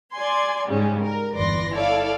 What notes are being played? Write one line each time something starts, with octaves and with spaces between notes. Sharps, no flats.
D5 G#5 C6 G#6
G#2 C#3 G3 G#3 C#4
A#4
G1 E2 B4 D5 C6 A#6
E4 A4 C#5 D5 F5